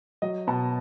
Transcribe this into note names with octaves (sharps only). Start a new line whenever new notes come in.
F#3 D#5
B2 A5